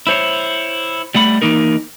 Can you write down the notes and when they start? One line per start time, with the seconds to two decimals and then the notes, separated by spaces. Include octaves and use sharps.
0.07 E4 C5 C#5
1.15 G3 A3 F#5 B5
1.42 E3 A#3 D#4 A#4